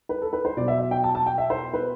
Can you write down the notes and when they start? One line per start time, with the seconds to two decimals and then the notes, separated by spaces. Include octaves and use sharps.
0.09 B4
0.22 A4
0.33 B4
0.45 C5
0.57 B2 F#3 D5
0.68 E5
0.80 E5
0.91 G5
1.04 A5
1.15 A5
1.26 G5
1.38 E5
1.50 C5
1.74 B4